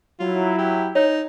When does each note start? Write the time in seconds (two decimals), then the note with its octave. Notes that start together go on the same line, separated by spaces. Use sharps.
0.20 F#3 E4 F4
0.58 G4
0.95 D#4 C#5